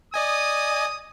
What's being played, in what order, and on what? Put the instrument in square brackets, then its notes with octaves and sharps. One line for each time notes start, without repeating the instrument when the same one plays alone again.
[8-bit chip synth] D5 D#5 G#5 [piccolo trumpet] D#6